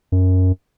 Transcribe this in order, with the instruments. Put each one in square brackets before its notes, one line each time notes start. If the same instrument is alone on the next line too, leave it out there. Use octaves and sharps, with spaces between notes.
[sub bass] F#2